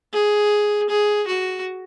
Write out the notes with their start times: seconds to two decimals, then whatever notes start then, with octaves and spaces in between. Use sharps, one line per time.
0.12 G#4
0.89 G#4
1.27 F#4